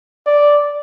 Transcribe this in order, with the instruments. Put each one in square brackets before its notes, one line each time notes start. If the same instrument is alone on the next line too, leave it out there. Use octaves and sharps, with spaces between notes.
[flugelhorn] D5